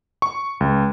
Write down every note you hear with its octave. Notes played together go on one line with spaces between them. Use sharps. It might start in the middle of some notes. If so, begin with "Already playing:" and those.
C#6
C#2